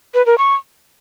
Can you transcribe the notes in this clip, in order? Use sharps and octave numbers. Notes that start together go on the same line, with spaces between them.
B4
A#4
C#6